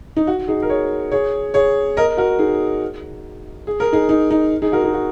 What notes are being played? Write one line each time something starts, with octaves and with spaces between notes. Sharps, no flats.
D#4
F#4
D#4 G#4
A#4
G#4 C#5
G#4 C#5
G#4 C#5
A#4 D#5
F#4 A#4
D#4 G#4
G#4
A#4
D#4 G#4
D#4
D#4
D#4 G#4
F#4 A#4
D#4 G#4
F#4